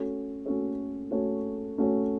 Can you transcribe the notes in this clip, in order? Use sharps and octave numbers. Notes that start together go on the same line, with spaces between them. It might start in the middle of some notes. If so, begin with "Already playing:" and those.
Already playing: A3 C#4 F#4 A4 C#5
A3 C#4 F#4 A4 C#5
A3 C#4 F#4 A4 C#5
A3 C#4 F#4 A4 C#5